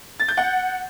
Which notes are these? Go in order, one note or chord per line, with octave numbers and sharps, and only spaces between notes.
A6
G6
F#5